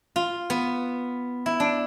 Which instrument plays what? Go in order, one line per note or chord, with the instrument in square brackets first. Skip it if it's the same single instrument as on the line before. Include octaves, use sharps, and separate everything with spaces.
[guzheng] F4
B3
E4
D4